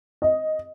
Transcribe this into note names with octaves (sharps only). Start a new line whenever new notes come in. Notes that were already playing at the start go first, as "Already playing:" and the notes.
D#5